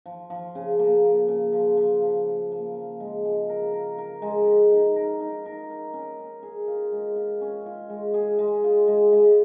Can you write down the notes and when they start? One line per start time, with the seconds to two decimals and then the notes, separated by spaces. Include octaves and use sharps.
0.06 F3
0.30 F3
0.55 C#3
0.79 A#3
1.04 A#3
1.28 C#3
1.53 F3
1.77 F3
2.02 F3
2.27 A#3
2.52 A#3
2.75 F3
3.00 G#3
3.25 G#3
3.49 A#4
3.74 A#4
3.98 A#4
4.22 G#3
4.47 A#4
4.72 D#4
4.96 A#4
5.20 D#4
5.46 A#4
5.70 A#4
5.94 C#4
6.19 C#4
6.43 G#4
6.68 F4
6.92 G#3
7.16 F4
7.41 C#4
7.66 F4
7.90 G#3
8.14 G#4
8.39 G#3
8.64 F4
8.88 G#3
9.12 G#3